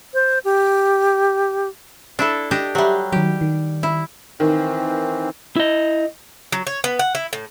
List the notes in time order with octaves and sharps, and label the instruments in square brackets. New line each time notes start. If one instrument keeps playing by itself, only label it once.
[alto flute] C5
G4
[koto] D4 E4 A4
D4 G4 D#5
[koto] F#3 G3 [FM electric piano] G4 E5
[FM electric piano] D#3 F#3 [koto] G4
[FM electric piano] D#3
[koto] E4
[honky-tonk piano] D#3 [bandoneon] E3 C4
[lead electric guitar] E4 D#5
[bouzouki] F#3
C#5
B3
F#5
E4
A2